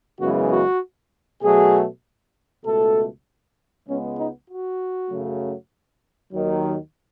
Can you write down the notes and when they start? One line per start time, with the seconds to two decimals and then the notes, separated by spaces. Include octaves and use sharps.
0.20 F#2 C#3 E3 G#3 B3 F#4
0.50 F#4
1.42 B2 F#3 A3 G#4
2.64 C#2 B2 A3 A4
3.88 C#2 C#3 G#3 B3 C#4
4.18 D#4
4.49 F#4
5.10 F#2 C#3 F#3 A3
6.33 D#2 D#3 F#3